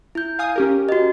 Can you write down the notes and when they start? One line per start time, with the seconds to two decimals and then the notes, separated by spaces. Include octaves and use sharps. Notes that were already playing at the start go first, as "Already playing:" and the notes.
0.15 E4 G6
0.39 F5 G#5 D#6
0.56 C#4 G4 A#4
0.89 F#4 D#5